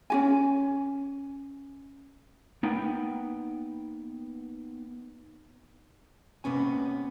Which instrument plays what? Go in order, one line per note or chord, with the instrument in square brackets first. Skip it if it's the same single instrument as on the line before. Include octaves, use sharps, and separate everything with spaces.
[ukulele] C#4 F#4 G#5
[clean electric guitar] A#3 B3 D#4 F#5 G5
[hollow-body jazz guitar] C3 A#3 B3 C#4 G#5